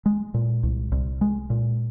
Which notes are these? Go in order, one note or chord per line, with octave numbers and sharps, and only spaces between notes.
G#3
A#2
C2
C2
G#3
A#2